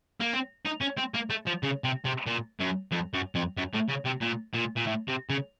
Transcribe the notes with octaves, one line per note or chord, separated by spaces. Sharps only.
A#3
C4
D#4
C#4
C4
A#3
A3
F3
C#3
C3
C3
A#2
F#2
F2
F#2
F2
F#2
A2
C#3
C3
A#2
A#2
A#2
A2
C3
C#3